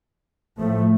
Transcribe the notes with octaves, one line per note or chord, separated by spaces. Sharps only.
A2 F3 A3